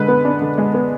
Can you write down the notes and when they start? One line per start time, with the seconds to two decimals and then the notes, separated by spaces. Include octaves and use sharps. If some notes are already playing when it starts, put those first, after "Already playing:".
Already playing: D3 G#3 B4
0.08 B3
0.25 D4
0.42 D3
0.58 G#3
0.74 B3